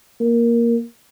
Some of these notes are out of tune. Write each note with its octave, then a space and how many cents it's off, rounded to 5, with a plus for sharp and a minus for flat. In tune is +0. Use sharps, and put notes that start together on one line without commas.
A#3 +5